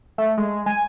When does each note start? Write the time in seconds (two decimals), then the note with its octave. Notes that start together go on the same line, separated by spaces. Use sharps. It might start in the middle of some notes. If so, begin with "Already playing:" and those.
0.18 A3
0.38 G#3
0.66 G#5